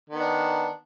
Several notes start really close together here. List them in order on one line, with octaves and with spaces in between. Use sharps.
D#3 B3 D4